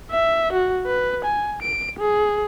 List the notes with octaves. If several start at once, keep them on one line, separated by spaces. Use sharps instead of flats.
E5
F#4
B4
G#5
D7
G#4